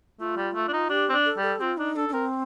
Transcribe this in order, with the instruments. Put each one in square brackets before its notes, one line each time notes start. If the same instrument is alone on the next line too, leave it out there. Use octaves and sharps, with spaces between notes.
[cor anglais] A3 [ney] F4
[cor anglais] G3
A3
D4
D#4
[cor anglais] D4 [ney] G4
[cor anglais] C4
D4
[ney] A4
[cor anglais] G3
[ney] A4
[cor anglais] C4 [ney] F4
[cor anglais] D4 [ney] D#4
[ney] D4 [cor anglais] A4
[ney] D4
[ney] C4 [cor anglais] A#4